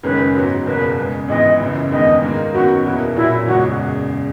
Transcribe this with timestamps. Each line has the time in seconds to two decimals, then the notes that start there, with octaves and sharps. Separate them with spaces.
0.03 F#1 F#2 D#3 G#3 C#4 B4
0.35 G#2 F#3 B3
0.66 F#1 E2 B2 A#3 B4
0.98 E2 C#3 G#3
1.28 G#1 G#2 E3 B3 D#5
1.60 F#1 F#2 C#3 E3
1.91 E1 D#2 D#3 G#3 B3 D#5
2.22 G#2 D#3 A#3
2.54 F#2 D#3 F#3 B3 F#4
2.85 E2 B2 A#3 E4
3.16 A#2 F#3 C#4 E4
3.47 F#1 E2 C#3 G#3 F#4